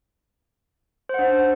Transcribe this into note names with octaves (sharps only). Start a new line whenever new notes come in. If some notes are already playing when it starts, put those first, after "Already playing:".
D4 C5 F#5